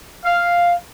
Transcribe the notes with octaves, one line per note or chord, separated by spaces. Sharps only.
F5